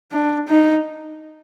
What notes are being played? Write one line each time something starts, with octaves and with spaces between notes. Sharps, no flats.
D4
D#4